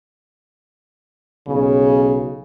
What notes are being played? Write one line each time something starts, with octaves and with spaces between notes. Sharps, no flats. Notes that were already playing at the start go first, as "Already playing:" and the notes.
B1 C#3